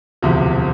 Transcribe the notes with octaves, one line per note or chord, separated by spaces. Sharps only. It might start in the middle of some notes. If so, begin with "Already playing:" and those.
E1 D2 C3 F3